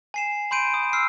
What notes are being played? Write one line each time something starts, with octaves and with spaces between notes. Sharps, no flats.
G#5 C7 E7
B5 C6 G6 D7 D#7
D#6
E6 F6 C7